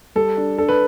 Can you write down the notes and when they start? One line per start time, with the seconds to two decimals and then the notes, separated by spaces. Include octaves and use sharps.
0.15 G3 A4
0.37 D4
0.57 D4 A4
0.69 B4